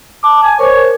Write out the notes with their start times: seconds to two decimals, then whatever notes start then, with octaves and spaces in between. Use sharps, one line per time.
0.24 A5 D6
0.43 G#5
0.59 A#4 C5 C#5